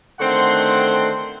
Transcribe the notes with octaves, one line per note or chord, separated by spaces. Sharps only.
D3 D#3 A3 C4 F#5 C6